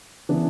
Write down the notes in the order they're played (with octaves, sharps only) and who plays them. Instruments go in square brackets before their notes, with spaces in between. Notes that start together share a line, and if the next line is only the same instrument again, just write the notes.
[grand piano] C#3 E3 B3 D4